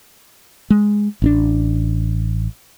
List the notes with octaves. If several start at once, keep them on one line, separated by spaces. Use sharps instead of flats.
G#3
A1 C4 D4